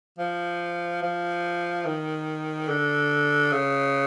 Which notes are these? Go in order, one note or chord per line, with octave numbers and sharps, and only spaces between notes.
F3
F3
D#3
D3
C#3